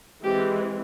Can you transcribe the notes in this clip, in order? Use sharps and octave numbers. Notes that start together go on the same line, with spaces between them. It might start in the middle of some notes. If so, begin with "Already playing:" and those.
E3 G#3 C4 G4